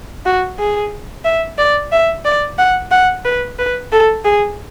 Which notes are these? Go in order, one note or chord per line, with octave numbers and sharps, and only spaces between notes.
F#4
G#4
E5
D5
E5
D5
F#5
F#5
B4
B4
A4
G#4